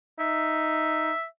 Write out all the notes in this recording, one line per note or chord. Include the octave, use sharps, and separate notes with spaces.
D#4 E5